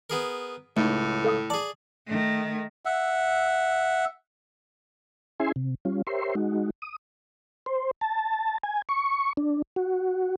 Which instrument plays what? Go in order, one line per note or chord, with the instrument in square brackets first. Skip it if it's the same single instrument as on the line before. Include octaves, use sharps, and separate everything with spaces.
[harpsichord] B3 G#4 A#4
[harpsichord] C#2 [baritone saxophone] A2 [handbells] A3 D#4
[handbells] A4 F5 D#6
[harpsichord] G#4 D5 [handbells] A5
[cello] D#3 A3
[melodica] E5 F#5
[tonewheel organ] C#4 E4 G#4 E5 G#5 C6
C3
G3 C#4 F4
G4 A#4 C5 C#5 E5 C6
G#3 D#4 F#4
D#6
C5
A5
G#5
C#6
D4
F#4